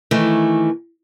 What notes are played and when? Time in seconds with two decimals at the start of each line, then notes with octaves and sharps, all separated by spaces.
0.11 D#3 E3 A3